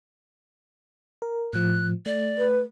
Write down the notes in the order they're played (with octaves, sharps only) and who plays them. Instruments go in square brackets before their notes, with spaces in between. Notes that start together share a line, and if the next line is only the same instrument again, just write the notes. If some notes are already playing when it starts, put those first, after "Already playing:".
[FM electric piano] A#4
[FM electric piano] A2 F3 [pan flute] F#6
[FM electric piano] A3 [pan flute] D5
[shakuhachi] B4